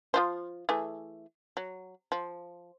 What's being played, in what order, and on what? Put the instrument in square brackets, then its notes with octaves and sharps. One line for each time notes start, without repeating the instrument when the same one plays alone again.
[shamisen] F3 F4 C5
E3 A3 G#4
F#3
F3